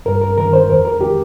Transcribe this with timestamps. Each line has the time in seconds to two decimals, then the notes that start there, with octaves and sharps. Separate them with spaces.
0.06 G2 A#4
0.21 A#4
0.38 D#3 A#4
0.53 C5
0.69 F2 A#4
0.85 A#4
1.01 D#3 G4